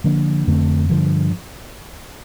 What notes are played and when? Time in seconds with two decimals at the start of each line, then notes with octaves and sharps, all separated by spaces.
0.04 D3 F3 A#3 D4
0.47 F2 D3 A3 C4
0.90 G2 D3 F3